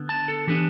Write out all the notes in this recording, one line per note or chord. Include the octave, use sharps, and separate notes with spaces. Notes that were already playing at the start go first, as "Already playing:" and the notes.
Already playing: D3 B3
A5
A4
E3 B3 D4 G4